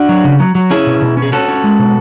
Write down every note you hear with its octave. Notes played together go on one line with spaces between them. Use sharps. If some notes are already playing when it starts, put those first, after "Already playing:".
Already playing: D4 F#4
F#3
C#3
F#3
F#3
C#4 E4 G#4
B2
B2
C#4
G#4
C#4 F#4 A4
C#4
G#3
B2